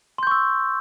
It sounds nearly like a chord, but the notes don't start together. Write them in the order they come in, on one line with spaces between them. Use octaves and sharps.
C6 G6 C#6 E6